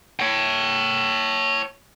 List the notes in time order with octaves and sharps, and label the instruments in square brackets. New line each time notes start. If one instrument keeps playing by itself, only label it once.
[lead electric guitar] C#5 G5